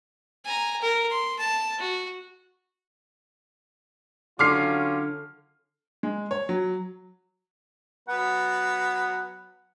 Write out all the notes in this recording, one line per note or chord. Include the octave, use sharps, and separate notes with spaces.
G#5 A#5
A#4
C6
A5
F#4
D3 F#3 C#4 F4 D6 F6 C7
G#3
C#5
F#3
F#3 B3 B4 F#5